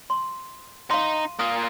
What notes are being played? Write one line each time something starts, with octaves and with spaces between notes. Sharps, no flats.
C6
D#4 F5 C6
A#3 F4 D#6